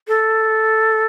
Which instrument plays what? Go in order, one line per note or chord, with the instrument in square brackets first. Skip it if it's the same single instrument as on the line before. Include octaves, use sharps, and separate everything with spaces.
[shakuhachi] A4